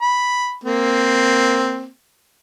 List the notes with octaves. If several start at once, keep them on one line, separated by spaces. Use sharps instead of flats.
B5
A#3 C4